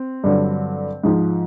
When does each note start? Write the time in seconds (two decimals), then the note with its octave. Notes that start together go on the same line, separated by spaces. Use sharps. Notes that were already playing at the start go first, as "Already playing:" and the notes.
Already playing: C4
0.24 G2 D3 F#3
1.03 G#2 F3